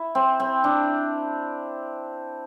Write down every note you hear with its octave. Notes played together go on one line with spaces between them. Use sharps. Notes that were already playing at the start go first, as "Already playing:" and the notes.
Already playing: E4
C4
C4
D4